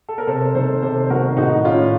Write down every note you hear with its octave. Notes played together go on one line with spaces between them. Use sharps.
A4
A#4
C3 A4 C5
D#3 A4 C5
C3 A4 C5
C5
D#3 F#4 A#4
A2 D#4 F#4
A2 C#4 F4